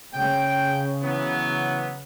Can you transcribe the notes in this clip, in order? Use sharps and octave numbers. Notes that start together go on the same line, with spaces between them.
C#3 G5
E3 F#3 B3